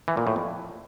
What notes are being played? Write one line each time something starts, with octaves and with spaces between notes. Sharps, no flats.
E3
A#2
A2
F2